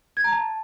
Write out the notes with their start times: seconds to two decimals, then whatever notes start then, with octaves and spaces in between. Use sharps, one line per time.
0.17 G#6
0.24 A#5
0.32 A5